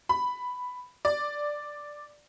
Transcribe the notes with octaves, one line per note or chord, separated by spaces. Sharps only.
B5
D5